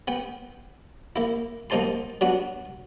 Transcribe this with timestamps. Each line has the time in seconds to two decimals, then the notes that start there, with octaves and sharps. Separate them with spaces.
0.08 B3 G5
1.16 A#3 E4
1.70 B1 A#3 D#4 C5 A5 C6
2.21 F#3 B3 D4 F#4